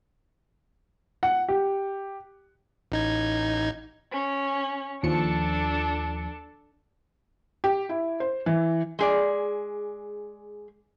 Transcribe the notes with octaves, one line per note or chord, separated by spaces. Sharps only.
F#5
G4
A1 D#4 G#6
C#4
D#2 F3 D4 A4 C#7
G4
E4
C5
E3
G#3 G#4 D5